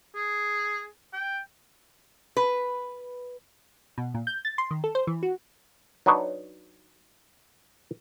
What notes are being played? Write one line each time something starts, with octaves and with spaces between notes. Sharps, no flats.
G#4
G5
B4
B2
A#2
G6
A6
C6
D#3
A4
C5
E3
F#4
F#3 D4 D#4 B4 C#5